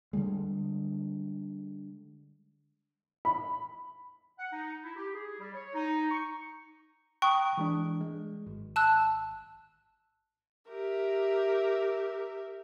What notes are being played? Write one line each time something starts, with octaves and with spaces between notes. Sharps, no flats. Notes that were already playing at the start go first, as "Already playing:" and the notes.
D3 D#3 G3 G#3
B5
F#5
D#4
E4
G4
G#4
G3
C#5
D#4
C#6
G5 A#5 C#6 D#6 F#6
E3 G#3 D4
G#3
G#1
A5 E6 F#6
G4 A#4 E5